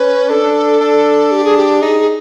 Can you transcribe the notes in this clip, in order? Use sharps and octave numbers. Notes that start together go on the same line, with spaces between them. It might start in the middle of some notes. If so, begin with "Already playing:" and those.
Already playing: C#4 B4
D4 A4
D4
G4
G#4
G4
D#4 G#4
G#4